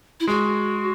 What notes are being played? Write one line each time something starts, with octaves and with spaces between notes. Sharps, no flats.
E4
G#3 F#4